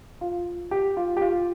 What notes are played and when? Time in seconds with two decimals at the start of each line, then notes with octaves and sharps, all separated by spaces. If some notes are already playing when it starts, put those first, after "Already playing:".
0.21 F4
0.71 G4
0.97 F4
1.17 G4
1.21 F4